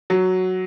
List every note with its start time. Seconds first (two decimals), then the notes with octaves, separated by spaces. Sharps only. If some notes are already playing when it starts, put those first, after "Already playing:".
0.10 F#3